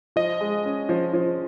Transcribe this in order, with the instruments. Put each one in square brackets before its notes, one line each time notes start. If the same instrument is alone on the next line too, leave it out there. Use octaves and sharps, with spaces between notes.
[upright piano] F3 [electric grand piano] D#5
[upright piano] G#3
C#4
F3
F3